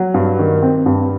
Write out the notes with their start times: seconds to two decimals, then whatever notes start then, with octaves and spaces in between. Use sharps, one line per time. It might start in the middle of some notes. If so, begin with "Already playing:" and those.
Already playing: F#3
0.14 G2
0.39 D#3
0.62 C4
0.86 G2